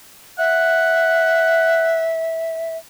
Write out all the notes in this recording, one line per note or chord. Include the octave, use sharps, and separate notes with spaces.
E5 F#5